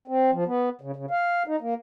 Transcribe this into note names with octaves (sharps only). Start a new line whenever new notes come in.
C4
F3
B3
C#3
C#3
F5
D#4
A#3